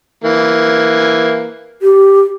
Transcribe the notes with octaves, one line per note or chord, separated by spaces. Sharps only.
E3 A#3
G4